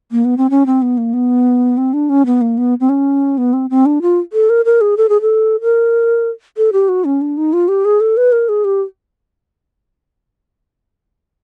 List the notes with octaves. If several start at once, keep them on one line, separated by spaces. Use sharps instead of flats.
A#3
B3
C4
C#4
C4
B3
A#3
B3
C4
D4
C#4
B3
A#3
B3
C4
C#4
B3
C4
C4
D4
F4
A4
A#4
A#4
G#4
A4
G#4
A4
A#4
A4
G4
F#4
C#4
D4
D#4
F4
G4
G#4
A4
B4
A#4
G#4
G4